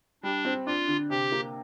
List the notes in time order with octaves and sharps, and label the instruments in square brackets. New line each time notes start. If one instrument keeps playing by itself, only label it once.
[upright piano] G3 [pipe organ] D4
[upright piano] C4
[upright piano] D4 [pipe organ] F4
[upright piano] D3
[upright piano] C3 [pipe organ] G4
[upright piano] A#3